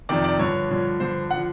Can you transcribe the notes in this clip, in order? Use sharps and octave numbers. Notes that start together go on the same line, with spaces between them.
F2 C3 D#3 D5
D5
G2 D3 F3 C#5
G2 D3 F3
G2 D3 F3 C5
D3 F3 F#5